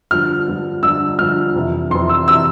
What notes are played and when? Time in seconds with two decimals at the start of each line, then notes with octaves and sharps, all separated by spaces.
0.11 G2 D3 F3 F6
0.48 G2 D3 F3
0.83 G2 D3 F3 E6
1.19 G2 D3 F3 F6
1.55 F2 C3 E3
1.91 F2 C3 E3 C6
2.09 E6
2.28 C3 E3 E6